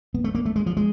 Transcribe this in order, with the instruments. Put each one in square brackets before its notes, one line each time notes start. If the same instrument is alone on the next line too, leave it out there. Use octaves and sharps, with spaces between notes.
[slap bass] B3
A3
A#3
A3
G#3
F3
G#3